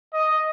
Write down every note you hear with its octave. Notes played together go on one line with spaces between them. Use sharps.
D#5